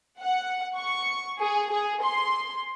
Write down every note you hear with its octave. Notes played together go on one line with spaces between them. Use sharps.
F#5
C#6
G#4
G#4
C6